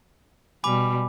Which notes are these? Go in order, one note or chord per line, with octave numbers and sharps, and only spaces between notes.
B2 G3 G#5 B5 D6